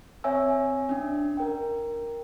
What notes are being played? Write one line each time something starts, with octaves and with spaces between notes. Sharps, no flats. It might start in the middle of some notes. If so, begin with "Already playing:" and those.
C4 C#5 E5 G#5 E6
C#4 D4
A#4 G5